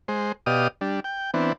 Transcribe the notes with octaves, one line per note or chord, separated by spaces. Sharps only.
G#3 C5
B2 G4 D5 D#5 F5 D#6
G3 D4
G5
E3 B3 C4 D4